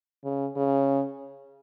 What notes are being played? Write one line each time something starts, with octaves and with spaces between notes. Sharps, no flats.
C#3
C#3